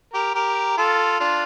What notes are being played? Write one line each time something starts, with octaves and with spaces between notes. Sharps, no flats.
G4 A#4
G4 A#4
F4 A4
D4 F4